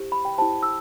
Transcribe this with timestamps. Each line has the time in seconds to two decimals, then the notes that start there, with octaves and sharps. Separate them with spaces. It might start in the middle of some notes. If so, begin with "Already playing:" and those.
Already playing: E4 G4 C5
0.12 B5
0.25 G5
0.38 E4 G4 C5 A5
0.63 E6